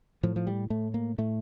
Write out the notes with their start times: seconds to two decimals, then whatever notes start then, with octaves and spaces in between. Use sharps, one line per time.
0.23 A2 F3
0.36 F3
0.47 G3
0.70 A2 A3
0.94 A#3
1.18 A2 A3